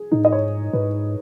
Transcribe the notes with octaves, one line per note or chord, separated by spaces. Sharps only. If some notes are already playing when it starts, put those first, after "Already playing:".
Already playing: G#4
A2 D#4
D#5
G#2 C#5
G#2 B4